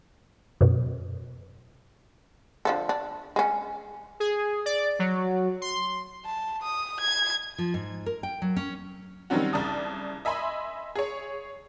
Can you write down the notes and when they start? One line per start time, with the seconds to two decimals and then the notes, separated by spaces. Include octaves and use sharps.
0.61 F#2 B2
2.65 D3 F3 A4
2.89 D4
3.36 G#3 C#4
4.20 G#4
4.66 D5
4.99 F#3
5.62 C6
6.26 A5
6.63 D#6
7.01 G#6
7.58 F3
7.74 G#2
8.06 A#4
8.23 G5
8.42 F#3
8.56 C#4
9.30 D#3 F#3 G3 C4 C#4 F#4
9.53 C2 C#3 D5 A5 D#6
10.25 D#5 E5 G#5 B5 C6
10.96 G#4 C#5